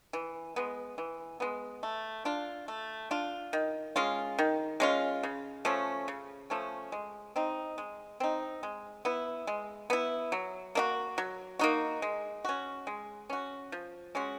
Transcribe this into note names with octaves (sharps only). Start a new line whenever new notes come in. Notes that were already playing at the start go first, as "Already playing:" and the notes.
E3
G#3 B3
E3
G#3 B3
A3
D4 F4
A3
D4 F4
D#3
G#3 C#4 F4
D#3
G#3 C#4 F4
C#3
F3 A3 C#4
C#3
F3 A3 C#4
G#3
C4 D#4
G#3
C4 D#4
G#3
B3 E4
G#3
B3 E4
F#3
A#3 D#4 F#4
F#3
A#3 D#4 F#4
G#3
C#4 F#4
G#3
C#4 F#4
F3
G#3 C#4 F#4